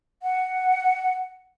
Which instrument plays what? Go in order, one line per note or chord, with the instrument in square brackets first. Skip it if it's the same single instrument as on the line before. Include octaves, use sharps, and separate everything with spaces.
[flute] F#5